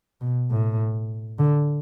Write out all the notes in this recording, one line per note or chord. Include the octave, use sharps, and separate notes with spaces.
B2
A2
D3